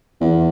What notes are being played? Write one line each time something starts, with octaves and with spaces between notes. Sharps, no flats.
E2